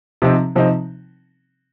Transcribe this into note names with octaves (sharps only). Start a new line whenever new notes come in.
C3 F3 C4 D#4
C3 F3 C4 D#4